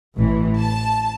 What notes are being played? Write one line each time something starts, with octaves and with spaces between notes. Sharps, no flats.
A1 E3
A5